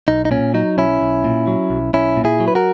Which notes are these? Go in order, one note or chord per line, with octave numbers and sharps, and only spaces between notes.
B1 D#4
D#4
A#2 C#4
F#3 D#4
B1 C#4 E4
B1
A#2
F#3
B1
B1 C#4 E4
A#2
E4 G#4
F#3
B4
F#4 A#4